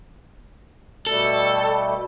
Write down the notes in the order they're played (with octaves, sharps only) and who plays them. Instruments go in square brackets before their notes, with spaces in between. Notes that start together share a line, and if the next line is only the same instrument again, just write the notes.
[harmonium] B2 G3 A3 [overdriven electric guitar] A4